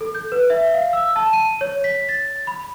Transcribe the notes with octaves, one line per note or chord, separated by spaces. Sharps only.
A4
G6
B4
E5
F5
E6
A5
D#7
C#5
B6
A6
B5